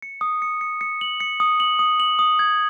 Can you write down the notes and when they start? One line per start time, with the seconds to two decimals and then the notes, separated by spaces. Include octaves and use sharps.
0.02 C#7
0.21 D#6
0.42 C#7
0.61 C#7
0.81 C#7
1.01 F#7
1.20 C#7
1.40 D#6
1.60 F#7
1.79 D#6
2.00 F#7
2.19 D#6
2.39 G#6